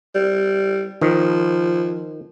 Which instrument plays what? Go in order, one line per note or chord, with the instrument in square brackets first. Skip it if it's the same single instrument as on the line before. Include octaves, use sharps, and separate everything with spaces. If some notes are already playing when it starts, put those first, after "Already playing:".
[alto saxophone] G3
[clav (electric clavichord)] D#3 [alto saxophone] F3